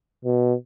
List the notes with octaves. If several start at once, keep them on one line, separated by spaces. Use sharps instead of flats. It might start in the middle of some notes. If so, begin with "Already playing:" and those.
B2